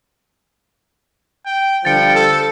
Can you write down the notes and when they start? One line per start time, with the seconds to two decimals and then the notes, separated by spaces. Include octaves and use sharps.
1.46 G5
1.85 D3 F3 G3 G5 A6 C#7
2.15 A4